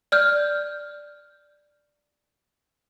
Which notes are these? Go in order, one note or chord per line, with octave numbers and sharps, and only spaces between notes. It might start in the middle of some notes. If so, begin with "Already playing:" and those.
D5 F6 G6